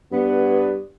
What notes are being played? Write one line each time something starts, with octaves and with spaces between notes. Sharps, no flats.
G2 B3